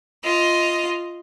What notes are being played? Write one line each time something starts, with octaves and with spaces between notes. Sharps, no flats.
F4 D#5